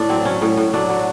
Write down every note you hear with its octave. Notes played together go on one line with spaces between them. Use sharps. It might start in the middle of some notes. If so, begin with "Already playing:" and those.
Already playing: A2 D4
F#3 C4
F#3 C#4
A2
A2
F#3 D4
F#3